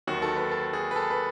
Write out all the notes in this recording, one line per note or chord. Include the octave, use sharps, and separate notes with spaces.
D#2 D#3 F#3 F#4
A4
B4
A4
G#4
B4
A4
B4